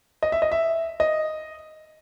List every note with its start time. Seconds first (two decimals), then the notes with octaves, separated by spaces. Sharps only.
0.23 D#5
0.32 E5
0.42 D#5
0.52 E5
1.00 D#5